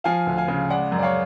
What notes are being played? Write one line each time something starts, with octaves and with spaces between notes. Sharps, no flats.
F3 F5 G#5
D2
F5 G#5
C#3
G#3 D5 F#5
F#2
D5
C#5 F5